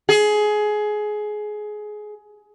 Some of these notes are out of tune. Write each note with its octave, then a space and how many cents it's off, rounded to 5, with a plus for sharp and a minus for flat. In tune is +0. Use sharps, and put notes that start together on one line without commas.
G#4 +20